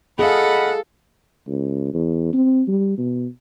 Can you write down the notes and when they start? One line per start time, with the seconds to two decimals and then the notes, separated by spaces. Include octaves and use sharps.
0.19 G#4 A4 D#5 F5 F#5 B5
1.47 C#2
1.94 E2
2.33 C4
2.68 G3
2.98 B2